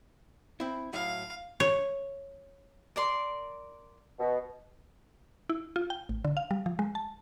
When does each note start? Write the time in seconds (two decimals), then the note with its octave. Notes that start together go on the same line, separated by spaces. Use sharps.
0.60 C4 E4
0.93 A2 F#3 E4 F5
1.60 C#5
2.96 A#4 D5 C6
4.19 B2
5.49 E4
5.76 F4
5.90 G5
6.09 A1
6.25 D3
6.37 F5
6.51 G3
6.66 F3
6.79 G#3
6.95 A5